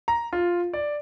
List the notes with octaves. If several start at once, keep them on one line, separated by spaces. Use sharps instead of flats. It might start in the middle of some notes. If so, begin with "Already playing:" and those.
A#5
F4
D5